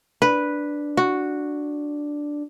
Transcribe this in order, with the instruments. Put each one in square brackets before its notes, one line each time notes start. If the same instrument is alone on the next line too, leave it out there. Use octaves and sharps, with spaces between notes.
[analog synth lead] D4 [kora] B4
[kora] F#4